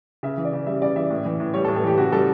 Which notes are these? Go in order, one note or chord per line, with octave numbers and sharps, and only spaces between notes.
C#3 E5
E3
D5
C#3
G3 E5
C#3 D5
E3 E5
A2
E3
A2
G3 C#5
A4
A2
A4
E3 G4
C#3 F#4
G3 A4